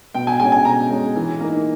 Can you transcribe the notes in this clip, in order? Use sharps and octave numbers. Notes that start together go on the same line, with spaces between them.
B2 G5
G#5
G#3 C#4 G#5
G#5
B2 A#5
G#3 C#4
E3
A#3 D#4